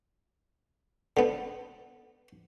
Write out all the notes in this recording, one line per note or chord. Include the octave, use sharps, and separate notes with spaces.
D3 B3